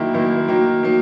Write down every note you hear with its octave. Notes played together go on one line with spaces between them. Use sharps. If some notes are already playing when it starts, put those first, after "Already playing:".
Already playing: F#2 D#3 A#3 E4
F#2 D#3 A#3 E4
D#3 F#3 A#3
D#3 F#3 A#3